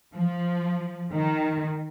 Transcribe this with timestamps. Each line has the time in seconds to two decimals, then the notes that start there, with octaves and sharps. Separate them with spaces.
0.14 F3
1.13 D#3